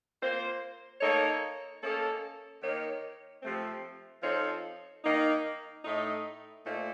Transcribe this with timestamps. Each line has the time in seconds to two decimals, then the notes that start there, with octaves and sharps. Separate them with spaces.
0.20 A#3 F4 C5
1.00 A#3 D#4 A4 C#5
1.81 A#3 C#4 A4 D#5
2.62 D#3 A#3 D#4 A#4 C#5
3.43 C3 F3 A3 C4
4.22 F3 C4 D#4 A4 C#5
5.03 D#3 A#3 D#4
5.84 A2 A3 D#4
6.64 A#2 A3 D#4 A4 C5